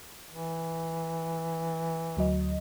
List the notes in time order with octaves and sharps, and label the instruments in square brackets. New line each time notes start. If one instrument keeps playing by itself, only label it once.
[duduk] E3
[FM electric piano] D2 F#3 D#5